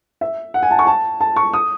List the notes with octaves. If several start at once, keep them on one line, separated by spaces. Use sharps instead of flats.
E5
F#5
G#5
A5
C#6
A5
A5
C#6
D#6